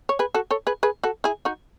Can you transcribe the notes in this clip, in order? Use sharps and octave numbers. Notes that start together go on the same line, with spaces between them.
C#5
G#4 B4
F#4 A4
A4 C#5
G#4 B4
G#4 B4
F#4 A4
E4 G#4
D#4 F#4